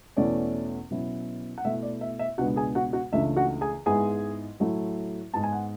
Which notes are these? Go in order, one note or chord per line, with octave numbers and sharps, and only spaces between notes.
E2 B2 A3 C#4 D5
B2 F#3 C#4 E4
F#5
B2 A3 E4 E5
D5
E5
E5
C#2 B2 G#3 B3 D4 F#4 F#5
G#4 G#5
F#4 F#5
F#4 F#5
C#2 C#3 E3 A3 D4 E5
F#4 F#5
G#4 G#5
G#2 G#3 B3 E4 G#4 G#5
A2 F#3 A3 E4
G#2 G#3 B3 A5
G#5
F#5